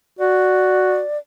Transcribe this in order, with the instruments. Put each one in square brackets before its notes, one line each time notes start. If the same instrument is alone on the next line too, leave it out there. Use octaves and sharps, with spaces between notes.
[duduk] F#4 [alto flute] D5